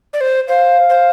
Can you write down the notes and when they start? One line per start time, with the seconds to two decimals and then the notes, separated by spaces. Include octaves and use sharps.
0.13 D5
0.21 C5
0.48 C5 F5
0.89 C5